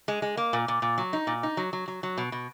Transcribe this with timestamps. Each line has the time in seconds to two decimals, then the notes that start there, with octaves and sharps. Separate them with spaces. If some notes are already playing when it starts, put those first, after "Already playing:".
0.08 G#3
0.22 G#3
0.37 A#3
0.53 A#2
0.68 A#2
0.82 A#2
0.98 F#3
1.13 D#4
1.27 A#2
1.43 D#4
1.57 F#3
1.73 F#3
1.88 F#3
2.03 F#3
2.18 B2
2.32 B2